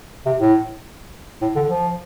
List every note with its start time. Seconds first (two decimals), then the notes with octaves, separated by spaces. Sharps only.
0.26 C3
0.40 A2
1.41 A2
1.55 D3
1.70 F3